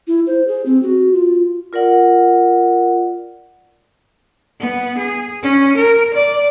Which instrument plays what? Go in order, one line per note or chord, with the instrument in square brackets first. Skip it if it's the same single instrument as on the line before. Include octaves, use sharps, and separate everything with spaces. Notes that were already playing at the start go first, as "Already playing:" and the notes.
[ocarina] E4
C5
G#4
C4
F#4
F4
[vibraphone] F4 A#4 D5 F#5
[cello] B3
G#4
C#4
A#4
D5